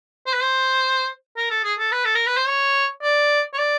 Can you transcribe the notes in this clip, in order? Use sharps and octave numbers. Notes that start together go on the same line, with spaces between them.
C5
B4
C5
A#4
A4
G#4
A4
B4
A4
A#4
B4
C5
C#5
D5
C#5
D5